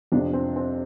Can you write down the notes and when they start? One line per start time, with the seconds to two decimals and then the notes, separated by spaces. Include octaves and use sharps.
0.12 F2 C3 D4
0.33 C4
0.56 C4